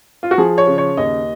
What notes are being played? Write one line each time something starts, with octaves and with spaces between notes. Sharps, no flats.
F4
F#4
F3 G#4
C#5
C#3
C#5
D#2 D#5